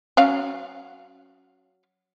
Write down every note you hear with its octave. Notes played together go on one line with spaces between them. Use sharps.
F#3 C#4 F5